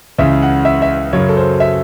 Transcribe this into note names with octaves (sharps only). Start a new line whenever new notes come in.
C#2 C#3 E3 E5
F#5
E5
E5
F#2 C#3 F#3 C#5
A4
C5
E5